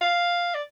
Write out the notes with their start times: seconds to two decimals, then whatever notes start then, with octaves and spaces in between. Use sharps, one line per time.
0.01 F5
0.55 D5